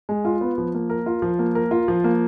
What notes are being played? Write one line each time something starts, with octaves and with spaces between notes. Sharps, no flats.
G#3
F4
B3
F3
A#3
A#4
F4
F3
A#3
A#4
F4
F3
A#3